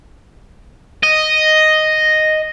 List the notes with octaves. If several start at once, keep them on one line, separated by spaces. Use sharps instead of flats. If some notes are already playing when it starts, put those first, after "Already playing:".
D#5